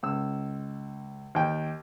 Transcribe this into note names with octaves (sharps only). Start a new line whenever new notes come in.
C#2 E6
D#2 G5